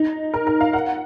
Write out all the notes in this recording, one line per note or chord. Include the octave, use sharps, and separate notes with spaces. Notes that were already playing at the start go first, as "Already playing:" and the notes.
Already playing: D#4
A#4
A#4
F5
F#5